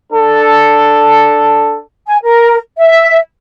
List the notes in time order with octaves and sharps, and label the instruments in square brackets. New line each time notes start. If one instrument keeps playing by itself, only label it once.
[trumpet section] D4 A4
[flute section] G#5
A#4
E5